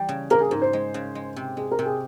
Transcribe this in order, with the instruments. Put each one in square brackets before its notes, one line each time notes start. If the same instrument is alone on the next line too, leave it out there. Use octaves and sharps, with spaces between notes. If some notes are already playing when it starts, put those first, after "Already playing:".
Already playing: [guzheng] E3 G3
C#3
[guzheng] A#3 [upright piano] A#4
[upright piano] G#4
[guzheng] G#2 [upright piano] A#4
[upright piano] C5
[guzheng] G#3
C#3
G#3
C3
[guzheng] G#3 [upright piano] G#4
[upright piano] A#4
[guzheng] C3
[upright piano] G#4